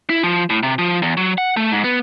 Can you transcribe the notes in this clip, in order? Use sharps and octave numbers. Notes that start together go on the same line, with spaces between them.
E4
F3
A2
C3
F3
E2
F#3
F#5
A3
G#2
B3